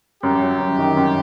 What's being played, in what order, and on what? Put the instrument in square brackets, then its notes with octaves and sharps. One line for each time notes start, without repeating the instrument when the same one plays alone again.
[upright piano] F#2 [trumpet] G4
[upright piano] F#3
F#2
D#3
F#2